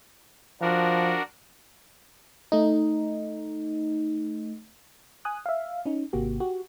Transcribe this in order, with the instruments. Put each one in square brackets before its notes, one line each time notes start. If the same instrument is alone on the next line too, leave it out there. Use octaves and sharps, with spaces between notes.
[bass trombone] F3 [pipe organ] D4 F#4 A#4
[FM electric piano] A3 D#4
G#5 D#6 F#6
E5 F5
C#4 D#4
G#1 C3 A#3 F#4 G4
F#4 G4